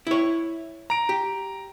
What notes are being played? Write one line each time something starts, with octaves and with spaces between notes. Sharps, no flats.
E4 C#5
A#5 D7
G4